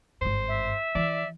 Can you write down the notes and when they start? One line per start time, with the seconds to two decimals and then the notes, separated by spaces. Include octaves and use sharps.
0.21 G#1 G2 C5
0.48 E5
0.95 E3 D5